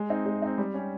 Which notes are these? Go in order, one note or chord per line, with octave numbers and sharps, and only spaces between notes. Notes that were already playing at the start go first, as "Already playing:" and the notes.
Already playing: G#3
C4 D#4
G#3
C4 D#4
G3
C#4 G4